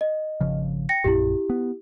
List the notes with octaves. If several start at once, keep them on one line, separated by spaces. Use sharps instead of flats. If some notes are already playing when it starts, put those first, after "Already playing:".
D#5
G#1 C#3 F3
G5 A#6 C#7
A#1 F#2 A#2 E4 G4
B3